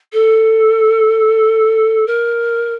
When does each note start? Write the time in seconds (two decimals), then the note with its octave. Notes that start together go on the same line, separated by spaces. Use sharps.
0.13 A4
2.06 A#4